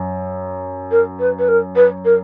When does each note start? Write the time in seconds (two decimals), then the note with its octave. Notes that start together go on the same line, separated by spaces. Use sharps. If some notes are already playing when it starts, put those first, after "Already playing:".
Already playing: F#2
0.91 A#4
1.19 B4
1.38 B4
1.48 A#4
1.75 B4
2.04 A#4